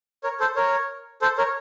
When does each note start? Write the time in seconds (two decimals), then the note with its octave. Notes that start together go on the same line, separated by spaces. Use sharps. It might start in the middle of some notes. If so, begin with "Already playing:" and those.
0.24 A#4 C#5
0.40 A4 C5
0.56 A#4 C#5
1.22 A4 C5
1.38 A#4 C#5